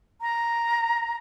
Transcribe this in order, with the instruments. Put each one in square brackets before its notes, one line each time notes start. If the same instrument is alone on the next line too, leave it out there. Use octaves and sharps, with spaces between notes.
[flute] A#5